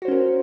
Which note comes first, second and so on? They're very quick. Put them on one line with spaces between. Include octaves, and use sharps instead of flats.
F#4 C5 C#4 A#4